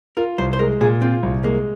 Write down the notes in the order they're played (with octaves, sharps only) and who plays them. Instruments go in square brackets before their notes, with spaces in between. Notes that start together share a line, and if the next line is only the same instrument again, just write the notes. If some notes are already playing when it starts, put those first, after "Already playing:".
[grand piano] F4 [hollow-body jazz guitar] A#4
[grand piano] C2 [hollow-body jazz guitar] C5
[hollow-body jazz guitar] C5
[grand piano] G#3 [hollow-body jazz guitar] A#4
[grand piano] A#2 [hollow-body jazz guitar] G#4
[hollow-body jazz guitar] C4 [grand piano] F4
[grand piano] C2
[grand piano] G#3 [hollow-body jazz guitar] A#3